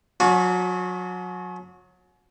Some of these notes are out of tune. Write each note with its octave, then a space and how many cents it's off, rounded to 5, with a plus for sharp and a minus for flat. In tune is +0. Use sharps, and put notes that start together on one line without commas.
F#3 -30 C#4 +40 F#4 -30